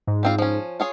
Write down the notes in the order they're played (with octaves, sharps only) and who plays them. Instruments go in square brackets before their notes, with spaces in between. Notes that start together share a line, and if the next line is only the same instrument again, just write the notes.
[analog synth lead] G#2
[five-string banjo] G3 C4 F4
F3 C#4
F4 G#4 C#5